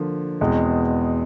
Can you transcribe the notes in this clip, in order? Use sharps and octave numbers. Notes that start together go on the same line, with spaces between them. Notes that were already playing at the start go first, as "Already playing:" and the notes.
Already playing: D3 F3 A#3
E2 B2 G#3 C4